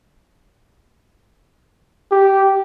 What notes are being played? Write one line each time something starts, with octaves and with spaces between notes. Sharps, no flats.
G4